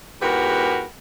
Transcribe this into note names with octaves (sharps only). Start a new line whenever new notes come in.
E2 G#2 F#4 G4 A#4 B4